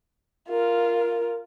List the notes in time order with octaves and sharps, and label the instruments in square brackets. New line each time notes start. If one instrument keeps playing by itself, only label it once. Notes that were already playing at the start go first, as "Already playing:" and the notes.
[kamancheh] F4 [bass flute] A#4